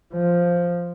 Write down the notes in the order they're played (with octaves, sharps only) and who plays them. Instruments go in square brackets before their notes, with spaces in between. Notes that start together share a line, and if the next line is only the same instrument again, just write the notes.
[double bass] F3